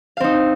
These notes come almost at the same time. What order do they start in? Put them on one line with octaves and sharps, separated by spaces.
F5 C4 D#4